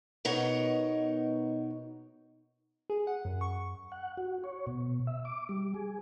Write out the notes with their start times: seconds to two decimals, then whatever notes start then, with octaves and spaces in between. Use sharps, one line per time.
0.25 B2 B3 D#4 A#4 C#5
2.90 G#4
3.07 F#5
3.25 F#2
3.41 C#6
3.92 F#5
4.17 F#4
4.44 C#5
4.67 B2
5.07 E5
5.25 D6
5.49 G3
5.74 G#4